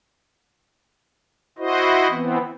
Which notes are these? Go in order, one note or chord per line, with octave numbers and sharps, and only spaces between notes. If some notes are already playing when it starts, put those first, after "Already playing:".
E4 F#4 C5 D#5
E3 B3 C4